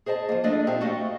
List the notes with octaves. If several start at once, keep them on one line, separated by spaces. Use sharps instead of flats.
G#4 C5 D#5 G5 A5
F3 A#3
F3 A3 D4 D5 D#5
A#2 C4 D#4 G4 E5
A3 F#4 D#5 F5